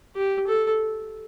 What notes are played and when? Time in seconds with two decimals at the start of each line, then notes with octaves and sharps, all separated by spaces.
0.16 G4
0.47 A4